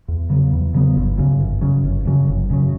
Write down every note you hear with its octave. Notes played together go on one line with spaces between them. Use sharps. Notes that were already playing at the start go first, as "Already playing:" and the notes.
E2
C#3 F#3 B3
E2
C#3 F#3 B3
G1
F#2 C#3 F#3
G1
F#2 C#3 F#3
G1
F#2 C#3 F#3
G1
F#2 C#3 F#3